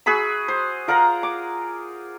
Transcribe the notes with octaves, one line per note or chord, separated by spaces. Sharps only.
F#4 G#4 B5 E6
C5
F4 A#4 F#5 A#5
D6